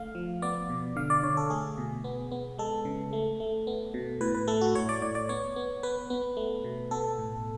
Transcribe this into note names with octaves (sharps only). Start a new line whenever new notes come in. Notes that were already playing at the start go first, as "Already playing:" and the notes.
Already playing: A3 F5
F3
B3 D5
B2
D3 F5
D5
D3 C#5
A4
A3 G#4
B2
B3
B3
G#3 A4
C#3
A3
A3
B3
B2
A2 B4
B4
A3 A4
F#4
A2 C#5
D5
A2 D5
D5
B3 C#5
B3
B3 B4
B3
A3
B2
B3 A4
A2